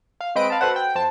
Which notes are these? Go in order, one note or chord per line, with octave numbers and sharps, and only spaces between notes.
F5
G#3 C4 B4 D#5 B5 D7
F5 A5 B5
F#4 A4 B4 C5 F#5
G5
F2 C5 A5